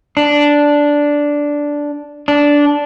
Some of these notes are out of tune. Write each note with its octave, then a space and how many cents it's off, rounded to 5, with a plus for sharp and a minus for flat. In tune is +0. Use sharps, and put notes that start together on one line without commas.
D4 -5
D4 -10